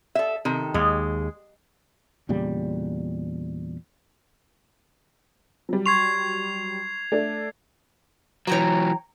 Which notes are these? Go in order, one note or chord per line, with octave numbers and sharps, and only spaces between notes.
A4 E5
C3 D#3 A4
D#2 G#3
E2 A#2 C#3 G3
F#3 G3
C6 C#6 G#6 C7 F7
A3 D4 A4
E3 F#3 C#5 G5 A#5